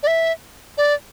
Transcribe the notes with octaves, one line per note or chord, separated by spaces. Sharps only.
D5
E5
D5